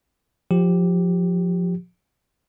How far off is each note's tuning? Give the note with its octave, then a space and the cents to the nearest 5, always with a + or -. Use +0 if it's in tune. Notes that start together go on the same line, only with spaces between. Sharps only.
F3 +20 G4 +0